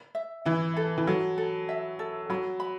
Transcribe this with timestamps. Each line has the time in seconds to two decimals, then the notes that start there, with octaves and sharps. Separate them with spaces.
0.15 E5
0.45 E3 E4
0.77 A4
0.98 E3
1.07 F#3 A4
1.38 A4
1.69 E5
1.99 A4
2.30 F#3 B5
2.60 B5